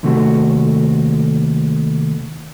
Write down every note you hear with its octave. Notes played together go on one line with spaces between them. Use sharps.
D#2 C3 A3 F#4